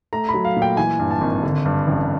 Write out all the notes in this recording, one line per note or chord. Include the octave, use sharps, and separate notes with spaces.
A3 A#5
B5
F#3
F5
A#2
G5
E3 G#5
G2
A5
G#1
D3
G2
A1